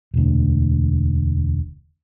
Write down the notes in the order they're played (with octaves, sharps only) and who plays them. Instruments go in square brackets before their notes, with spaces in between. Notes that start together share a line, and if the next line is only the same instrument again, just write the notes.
[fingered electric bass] E1 D2